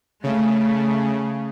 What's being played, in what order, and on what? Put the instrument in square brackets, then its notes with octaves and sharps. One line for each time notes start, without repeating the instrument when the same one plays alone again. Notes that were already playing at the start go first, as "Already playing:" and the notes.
[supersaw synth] C#3 [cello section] A3